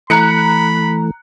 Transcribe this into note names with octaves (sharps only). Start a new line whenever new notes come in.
E3 A3 A#5 B5 F#6 C#7